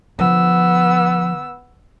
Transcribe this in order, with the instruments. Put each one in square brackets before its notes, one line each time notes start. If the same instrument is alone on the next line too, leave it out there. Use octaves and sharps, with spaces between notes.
[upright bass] D3 F3 [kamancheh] B3 E6